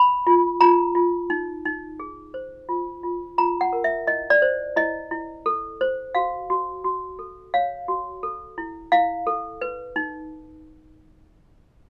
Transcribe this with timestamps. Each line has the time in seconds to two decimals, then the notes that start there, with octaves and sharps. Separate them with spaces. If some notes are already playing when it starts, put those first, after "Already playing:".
Already playing: B5
0.27 F4
0.61 F4 A#5
0.95 F4
1.30 D#4
1.65 D#4
2.00 G#4
2.34 C5
2.69 F4
3.03 F4
3.38 F4 A#5
3.61 F#5
3.73 A#4
3.84 E5
4.07 E4 D#5
4.30 D5
4.42 C5
4.76 E4 D#5
5.11 E4
5.46 A4
5.81 C5
6.15 F#4 F5
6.50 F#4
6.84 F#4
7.19 A4
7.54 C#5 F5
7.88 F#4
8.23 A4
8.58 E4
8.92 E4 F5
9.27 A4
9.61 B4
9.96 D#4